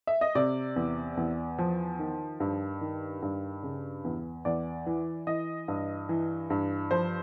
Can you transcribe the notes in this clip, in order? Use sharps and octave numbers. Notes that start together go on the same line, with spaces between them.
E5
D#5
C3 D5
E2
E2
F3
D#3
G2
D#3
G2
C#3
E2
E2 D5
E3
E3 D#5
G2
E3
G2
F3 C5